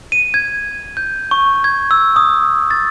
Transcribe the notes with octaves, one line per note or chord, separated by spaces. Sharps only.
D#7
G#6
G6
C#6
G#6
E6
D#6
A6